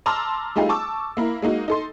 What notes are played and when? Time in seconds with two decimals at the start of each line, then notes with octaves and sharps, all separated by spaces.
0.06 A5 A#5 C6 D6 E6 F6
0.56 G3 A3 D#4 F4 G#4
0.69 A5 C#6 D6 E6
1.17 A#3 E4 A#4
1.42 G#3 A#3 D#4 F#4
1.68 D#4 A4 C6